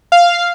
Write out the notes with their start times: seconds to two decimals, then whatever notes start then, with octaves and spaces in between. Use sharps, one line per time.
0.12 F5